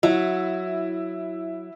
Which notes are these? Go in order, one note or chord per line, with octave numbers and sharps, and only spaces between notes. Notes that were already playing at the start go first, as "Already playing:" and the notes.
F#3 E4